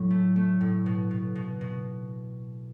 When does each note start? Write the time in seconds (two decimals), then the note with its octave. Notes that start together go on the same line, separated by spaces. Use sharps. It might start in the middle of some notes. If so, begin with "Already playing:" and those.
Already playing: A2 F#3
0.10 A3
0.36 A3
0.61 A2
0.86 B2
1.11 B2
1.35 B2
1.61 B2